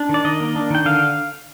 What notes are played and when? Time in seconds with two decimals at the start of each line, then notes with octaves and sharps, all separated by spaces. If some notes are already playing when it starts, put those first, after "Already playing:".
Already playing: D4
0.09 D#3
0.14 D5
0.25 D#3 D#5
0.40 A#3
0.55 D4
0.70 D#3 G5
0.85 D3 F5